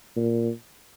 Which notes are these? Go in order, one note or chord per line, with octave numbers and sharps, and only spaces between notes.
A#2